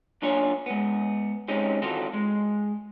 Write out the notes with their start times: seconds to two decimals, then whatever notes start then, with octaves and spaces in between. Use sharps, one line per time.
0.22 F#3 A#3 D4 F4 C#5 G#5
0.66 G#3 B3
1.48 G#3 C4 C#4 D#4 G4
1.82 D#3 E3 C4 F4 F#4 A4
2.13 G#3